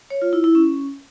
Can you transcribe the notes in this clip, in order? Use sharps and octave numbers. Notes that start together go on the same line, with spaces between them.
C#5
F4
E4
E4
C#4